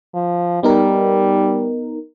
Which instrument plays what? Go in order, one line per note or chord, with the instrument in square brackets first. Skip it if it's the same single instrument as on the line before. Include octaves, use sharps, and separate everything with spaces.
[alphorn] F3
[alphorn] G3 [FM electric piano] B3 D#4 A#4